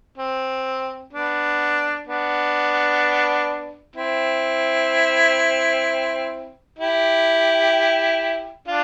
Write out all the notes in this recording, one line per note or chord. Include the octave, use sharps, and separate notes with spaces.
C4
B3 D4
B3 D4
C4 E4
E4 G4
D4 F4